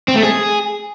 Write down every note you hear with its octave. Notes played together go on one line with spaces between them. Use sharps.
C4
A3
G#4